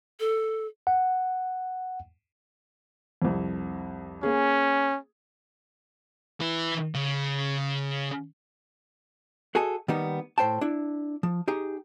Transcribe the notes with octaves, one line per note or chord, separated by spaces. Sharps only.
A4
F#5
C2 F2
A#3 C#4 G#4
E3 E4
C#3
F#4 G#4 A4 D#5 G#5
D#3 G3 A#3 B3 D#4
A2 C5 G5 A5
D4 E4
F3
D#4 G4 G#4